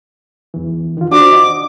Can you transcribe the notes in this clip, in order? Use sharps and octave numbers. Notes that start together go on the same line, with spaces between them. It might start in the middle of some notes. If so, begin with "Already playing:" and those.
E2 E3
D#3 F4
D4 F#4 C5 D6
D#5